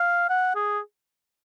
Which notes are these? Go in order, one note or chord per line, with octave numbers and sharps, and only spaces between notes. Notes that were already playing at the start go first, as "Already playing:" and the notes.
Already playing: F5
F#5
G#4